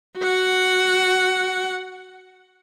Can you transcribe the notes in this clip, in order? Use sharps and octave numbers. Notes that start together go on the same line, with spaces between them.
F#4 F#5